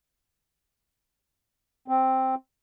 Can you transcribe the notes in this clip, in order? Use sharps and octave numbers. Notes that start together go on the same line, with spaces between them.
C4